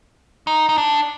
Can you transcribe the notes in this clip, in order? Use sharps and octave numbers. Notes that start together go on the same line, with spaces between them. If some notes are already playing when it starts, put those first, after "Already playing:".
D#4
D#4
D4